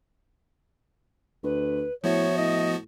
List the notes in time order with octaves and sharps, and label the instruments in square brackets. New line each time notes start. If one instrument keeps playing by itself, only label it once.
[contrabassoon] D2 [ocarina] B4
[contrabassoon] A2 [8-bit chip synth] F3 B3 F#4 [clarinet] C#5 [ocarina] E5
[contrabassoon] A2 [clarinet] D#5